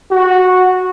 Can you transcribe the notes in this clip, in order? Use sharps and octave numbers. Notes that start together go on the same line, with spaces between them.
F#4